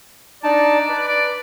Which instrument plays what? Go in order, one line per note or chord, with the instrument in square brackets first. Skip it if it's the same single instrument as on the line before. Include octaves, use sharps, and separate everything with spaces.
[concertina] D4 D#4 A5 [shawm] D5
[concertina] B4
[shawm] D5